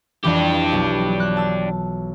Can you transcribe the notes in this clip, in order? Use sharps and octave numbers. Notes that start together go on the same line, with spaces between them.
F2 E3 D4 G4
B1
F#6
A5 E6